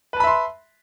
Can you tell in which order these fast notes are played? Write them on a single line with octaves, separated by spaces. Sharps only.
B4 A5 B5 E5 C6